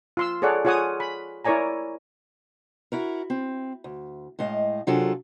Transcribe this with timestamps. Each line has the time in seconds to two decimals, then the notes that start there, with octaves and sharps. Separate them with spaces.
0.17 F4 C6 E6
0.42 G#4 A4 C#5 D5 F#5
0.65 F4 G#4 C#5 F#5 G#5 D#6
1.00 B5
1.45 E4 A#4 C#5 D5 G#5 A#5
2.92 E4 F#4 A#4
3.30 C4
3.84 D2
4.39 A2 G#3 D#5 F5
4.87 C3 F#3 D4 F4 G#4 A4